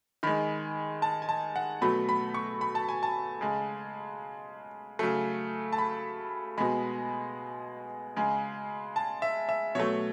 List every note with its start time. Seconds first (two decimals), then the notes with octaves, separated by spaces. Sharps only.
0.23 D#3 G#3 B5
1.02 A5
1.22 G#5
1.29 A5
1.56 F#5
1.81 B2 F#3 A3 B5
2.09 B5
2.34 C#6
2.61 B5
2.75 A5
2.89 G#5
3.03 A5
3.41 C#3 G#3
4.99 C#3 F#3 A3
5.73 A5
5.78 B5
6.58 B2 G#3 B5
8.16 C#3 G#3
8.96 A5
9.22 E5
9.49 E5
9.75 B2 F#3 A3 C#5